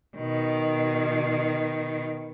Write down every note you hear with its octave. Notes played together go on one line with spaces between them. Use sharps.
B2 D#3